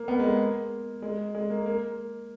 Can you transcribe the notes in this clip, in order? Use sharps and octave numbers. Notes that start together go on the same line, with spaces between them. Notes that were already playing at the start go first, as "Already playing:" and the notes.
Already playing: A#3
B3
G#3
A#3
G#3
G#3
A#3
A#3